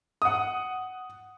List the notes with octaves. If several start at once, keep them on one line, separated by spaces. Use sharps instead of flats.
F#5 D#6